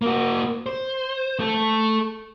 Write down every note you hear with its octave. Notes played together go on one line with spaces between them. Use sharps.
A#3 F#4
C5
A3 A4